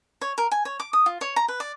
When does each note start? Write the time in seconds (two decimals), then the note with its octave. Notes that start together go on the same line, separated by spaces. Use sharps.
0.21 C#5
0.38 A#4
0.51 G#5
0.65 C#5
0.80 D6
0.93 D#6
1.06 F4
1.21 C#5
1.36 A#5
1.48 B4
1.60 D5